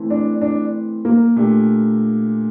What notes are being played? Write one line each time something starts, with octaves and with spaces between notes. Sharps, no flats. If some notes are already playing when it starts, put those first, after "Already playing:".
Already playing: E3 A3 C4
D4
D4
A#3
A#2 A3 D4 G4